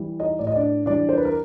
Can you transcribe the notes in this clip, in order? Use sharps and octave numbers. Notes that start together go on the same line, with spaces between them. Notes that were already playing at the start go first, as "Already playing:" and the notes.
Already playing: E3 G3
D#4 D#5
A2 D5
D#5
D4 D5
E3 G3 D4 D5
C5
B4
A#4